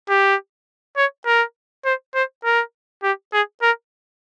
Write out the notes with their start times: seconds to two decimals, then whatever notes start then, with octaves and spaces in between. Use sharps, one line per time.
0.09 G4
0.97 C#5
1.25 A#4
1.85 C5
2.14 C5
2.44 A#4
3.03 G4
3.33 G#4
3.62 A#4